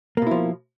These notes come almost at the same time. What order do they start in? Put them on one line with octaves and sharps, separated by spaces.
A#3 B2 E4 F3